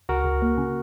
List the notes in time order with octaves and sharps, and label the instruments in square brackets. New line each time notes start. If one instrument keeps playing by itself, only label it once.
[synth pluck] C#2 [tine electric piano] F#4 A#4
[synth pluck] C#2
A#3
C#3